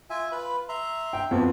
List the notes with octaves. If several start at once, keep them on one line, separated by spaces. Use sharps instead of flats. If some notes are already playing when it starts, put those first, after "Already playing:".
F4 E5 G#5
F4 B4 B5
E5 A#5 C6
G5
F2 A#3 B3 F#4